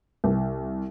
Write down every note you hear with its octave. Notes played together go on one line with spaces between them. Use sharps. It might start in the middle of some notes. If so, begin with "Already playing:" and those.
C2